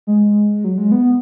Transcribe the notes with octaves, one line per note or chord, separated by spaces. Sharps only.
G#3
F#3
G#3
B3